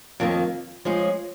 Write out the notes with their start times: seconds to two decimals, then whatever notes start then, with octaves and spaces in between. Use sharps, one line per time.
0.20 F2 D#3 A#3
0.85 F3 G#3 C#4 G#4